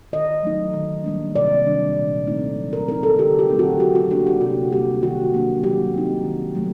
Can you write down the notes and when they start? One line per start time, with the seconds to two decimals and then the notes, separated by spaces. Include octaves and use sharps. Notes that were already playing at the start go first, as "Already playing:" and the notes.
0.12 D#3 D#5
0.43 F#3 A3 D#4
0.73 D#3
1.04 G3 A#3 D4
1.35 C3 D5
1.66 D#3 G3 D4
1.96 A#2
2.27 A3 C4 D#4
2.58 F#3
2.73 A#4
2.88 C4 D#4 A#4
3.03 A4
3.19 D3 G4
3.39 G4
3.49 F#3 A3 C4 D#4
3.59 F#4
3.80 F#3 G4
3.95 F#4
4.10 A#3 D4 G4
4.27 G4
4.41 C3 F#4
4.72 G3 A#3 G4
5.02 D#3 F#4
5.34 F#3 A#3 D4
5.64 F#3 G4
5.94 C4 D#4
6.25 D#3
6.55 F#3 A3